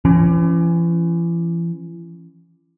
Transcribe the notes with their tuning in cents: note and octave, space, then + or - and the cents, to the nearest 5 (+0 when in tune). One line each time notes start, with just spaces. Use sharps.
E3 +40 C#4 +0